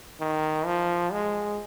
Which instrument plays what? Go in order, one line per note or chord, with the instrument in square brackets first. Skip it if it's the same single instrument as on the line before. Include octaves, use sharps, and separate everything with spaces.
[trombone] D#3
F3
G#3